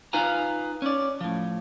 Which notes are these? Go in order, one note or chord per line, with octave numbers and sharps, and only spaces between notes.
D#4 F4 B4 F5 G#5 A#5
C#4 D5
A2 F3